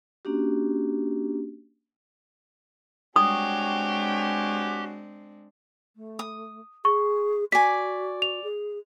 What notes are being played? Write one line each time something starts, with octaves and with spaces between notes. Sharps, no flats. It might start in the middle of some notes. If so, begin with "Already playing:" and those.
A#3 C#4 D4 F#4 G4
G#3 C4 D4 F#4 G4 C#5 G#5 D#6
A3
D#6
G#4 C#6
F#4 D5 G#5 B6
F7
G#4